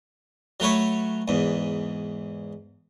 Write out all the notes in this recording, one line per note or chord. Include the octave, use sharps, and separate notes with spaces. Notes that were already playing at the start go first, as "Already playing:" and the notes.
F#3 A3 B4 C#5
E2 G#2